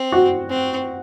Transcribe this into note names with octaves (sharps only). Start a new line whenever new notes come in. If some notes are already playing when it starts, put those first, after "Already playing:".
Already playing: C4
F#4
C4